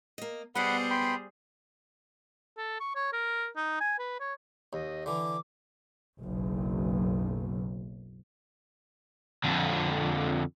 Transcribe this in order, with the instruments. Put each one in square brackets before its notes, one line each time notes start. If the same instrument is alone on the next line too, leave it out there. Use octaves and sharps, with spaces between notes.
[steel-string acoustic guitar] A#3 D#5
[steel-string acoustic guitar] B2 B3 [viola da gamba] G3 G#4 C5 [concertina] F#5 B5
[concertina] G5 B5 C6
[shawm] A4
C#6
C#5
A#4
D#4
G#5
B4
C#5
[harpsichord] D#2 [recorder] D#5
[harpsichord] D3 E3 [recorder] D6
[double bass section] F#1 B1
[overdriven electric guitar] F2 D3